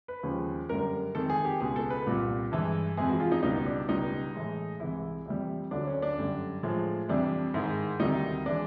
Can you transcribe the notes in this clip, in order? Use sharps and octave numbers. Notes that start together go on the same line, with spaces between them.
B4
D#2 C#3 F3 G#3
F#2 D3 G3 A#4
F2 C3 D#3 G#3 A4
G#4
G4
C#2 B2 G#3 G#4
A4
B4
C2 A#2 G3
G2 E3 G#3
F2 C3 E3 G#3 G#4
F#4
F4
D#4
C#2 B2 G3 D#4
D4
C#2 B2 G3 D#4
A2 E3 G#3
C2 C3 E3 G#3 E4
F2 C3 E3 G3
D2 D3 F#3 D4
C#4
D4
F#2 D3 G3
A2 F3 G#3
F2 C3 E3 G3 D4
G#2 D#3 G#3 E4
D2 C3 D#3 G3 D#4
E3 G#3 D4